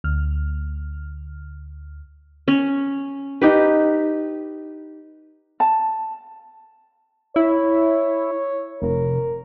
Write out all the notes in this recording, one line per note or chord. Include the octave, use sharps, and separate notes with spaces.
D2 F6
C#4
D#4 G4 B4
A5
E4 C#5
F1 A#4